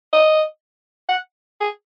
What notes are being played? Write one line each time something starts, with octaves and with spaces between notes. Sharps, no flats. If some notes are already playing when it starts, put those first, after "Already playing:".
D#5
F#5
G#4